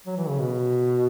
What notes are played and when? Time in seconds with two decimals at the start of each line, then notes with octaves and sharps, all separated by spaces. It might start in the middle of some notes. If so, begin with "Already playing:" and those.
0.07 F#3
0.17 E3
0.28 C#3
0.39 B2